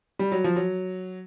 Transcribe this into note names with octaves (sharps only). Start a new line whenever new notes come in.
G3
F#3
F3
F#3